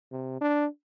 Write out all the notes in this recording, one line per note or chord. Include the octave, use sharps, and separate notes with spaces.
C3
D4